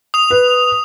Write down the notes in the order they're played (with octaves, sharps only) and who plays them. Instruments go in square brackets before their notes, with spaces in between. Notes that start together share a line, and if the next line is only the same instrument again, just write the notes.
[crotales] D#6 F7
[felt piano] B4